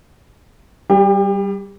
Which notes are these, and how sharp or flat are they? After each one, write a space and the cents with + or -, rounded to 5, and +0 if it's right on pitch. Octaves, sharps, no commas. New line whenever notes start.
G3 -10 G4 +35